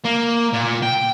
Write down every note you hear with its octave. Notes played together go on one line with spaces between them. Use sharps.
A#3
A#2
G5